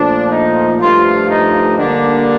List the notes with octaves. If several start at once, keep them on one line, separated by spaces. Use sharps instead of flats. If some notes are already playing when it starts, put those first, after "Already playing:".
Already playing: A#2 F3 A3 D4
D#4
G2 F3 A3 F4
D#4
D3 G3 A#3 D4